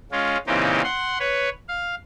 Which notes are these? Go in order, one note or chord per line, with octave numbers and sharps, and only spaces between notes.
G#3 C#4 F4
A#2 C#3 E3 C4 D#4 G4
F#5 C6
B4 C#5
F5